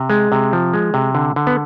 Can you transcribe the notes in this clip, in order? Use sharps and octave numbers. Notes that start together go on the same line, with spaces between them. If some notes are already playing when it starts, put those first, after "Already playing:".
Already playing: C3
G#3
C3
F3
G#3
C3
D3
D3
B3